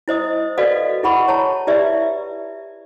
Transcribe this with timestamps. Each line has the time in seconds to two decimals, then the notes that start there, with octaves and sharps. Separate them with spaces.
0.08 E4 C5 D#5 D#6
0.58 F#4 A4 B4 D5 D#5 F5
1.03 E4 G#4 F#5 B5 C#6
1.28 C#5 A5 A#5
1.67 E4 G4 B4 D5 E5